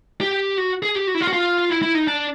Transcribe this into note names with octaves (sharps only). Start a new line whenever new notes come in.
G4
F#4
G#4
G4
F#4
E4
F4
F#4
F4
E4
E4
D#4
D4